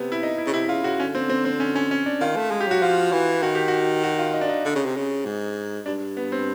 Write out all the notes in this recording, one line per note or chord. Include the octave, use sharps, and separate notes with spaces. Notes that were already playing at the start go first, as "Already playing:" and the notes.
Already playing: C3 B3
E4
D#4
E4
C#3
C3 E4
C#3 F4
C#3 F#4
D3 C#4
C4
C4
C4
C#4
C#4
C#4
D4
D#3 F4
A3
G#3
G4
F#3 F#4
F3 F4
E3
D#3 F#4
G4
F#4
F#4
F4
D#4
D4
D#4
D3
C#3
C3
C#3
G#2
G2 D4
B3
C4